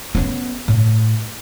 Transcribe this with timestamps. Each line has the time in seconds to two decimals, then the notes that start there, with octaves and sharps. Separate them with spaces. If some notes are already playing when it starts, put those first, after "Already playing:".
0.15 B3 C#4
0.68 A2